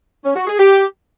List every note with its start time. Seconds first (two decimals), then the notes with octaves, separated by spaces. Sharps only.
0.24 C#4
0.36 F#4
0.47 G#4
0.59 G4